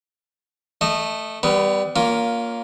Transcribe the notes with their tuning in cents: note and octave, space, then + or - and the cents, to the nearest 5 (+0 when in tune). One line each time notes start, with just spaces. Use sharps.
A3 +0 D#5 -25
G3 +0 B3 +35 B4 -25
A#3 +0 C#4 +35 F4 +10